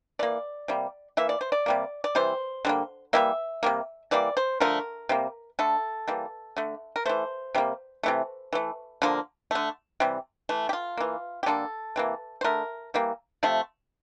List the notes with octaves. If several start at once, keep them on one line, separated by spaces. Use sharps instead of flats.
E3 A#3 D5
C3 G3 A#3
E3 A#3 E5
D5
C5
D5
C3 G3 A#3
D5
C3 E3 G3 C5
D3 G3 A#3
E3 G3 A#3 E5
C3 G3 A#3
E3 G3 A#3 D5
C5
D3 F3 A3 A#4
C3 G3 A#3
D3 A3 A4
E3 G3 A#3
D3 A3
A#4
E3 A3 C5
C3 G3 A#3
C3 E3 A3
E3 A3
D3 F3 A#3
D3 A3
C3 E3 G3
E3 A3
G4
F4
E3 A#3
G4
D3 G3 A#3 A4
C3 E3 A#3
C5
D3 A3 A#4
E3 G3 A#3
C3 F3 A3